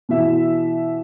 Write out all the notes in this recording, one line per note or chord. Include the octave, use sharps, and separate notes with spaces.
B2 E3 E5